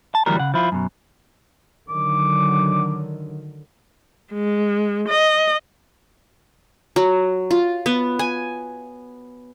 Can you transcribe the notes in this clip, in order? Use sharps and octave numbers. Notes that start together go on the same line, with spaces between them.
A5
D2 E3 F#3 G3 A#4
C#3 F#5
F3 E4 F4
F#2 B2
D3 D#3 F#3 D6
G#3
D#5
F#3
F4
B3
G#5